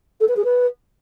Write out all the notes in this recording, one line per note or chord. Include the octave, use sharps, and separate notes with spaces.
A4
B4
G#4
B4